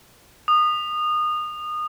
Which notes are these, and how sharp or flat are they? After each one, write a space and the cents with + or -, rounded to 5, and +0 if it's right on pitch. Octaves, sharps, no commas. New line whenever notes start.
D#6 -25